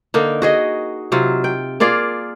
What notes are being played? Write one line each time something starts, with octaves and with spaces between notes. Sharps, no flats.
D3 A#3 D#4
F#4 G#4 D#5
C3 F#3 F4
G5
A#3 F4 G#4 D5